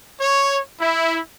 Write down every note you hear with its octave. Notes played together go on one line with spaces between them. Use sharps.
C#5
E4